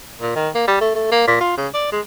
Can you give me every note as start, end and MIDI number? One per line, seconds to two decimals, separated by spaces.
0.21 0.34 46
0.36 0.49 51
0.55 0.65 58
0.68 0.79 55
0.81 0.91 57
0.95 1.11 57
1.11 1.24 58
1.27 1.39 46
1.41 1.56 65
1.57 1.68 49
1.74 1.91 74
1.92 2.00 56